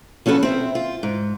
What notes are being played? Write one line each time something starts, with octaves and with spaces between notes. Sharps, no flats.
F3 C#4 F#4 A4 B4
C4 E5
F4
G#2